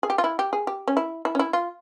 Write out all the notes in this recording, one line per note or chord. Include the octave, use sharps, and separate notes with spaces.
G#4
G4
F4
E4
G4
G#4
G4
C#4
E4
E4
C#4
E4
F4